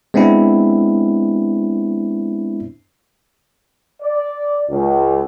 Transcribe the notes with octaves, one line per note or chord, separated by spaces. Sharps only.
G#3 B3 C4 D4 E4
D5
C#2